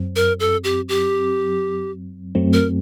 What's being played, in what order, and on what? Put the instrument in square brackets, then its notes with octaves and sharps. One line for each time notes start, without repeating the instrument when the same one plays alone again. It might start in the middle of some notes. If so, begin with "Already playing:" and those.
Already playing: [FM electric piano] F#2 F#3 C4
[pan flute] A#4
A4
G4
G4
[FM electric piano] F#2 F#3 A3 C4
[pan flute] A#4